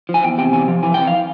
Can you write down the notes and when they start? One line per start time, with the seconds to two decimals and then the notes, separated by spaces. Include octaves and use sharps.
0.09 F3
0.14 G#5
0.24 E2 G5
0.38 C3 G5
0.53 E2 G#5
0.68 F3
0.83 E3 G#5
0.94 F2 G5
1.07 F5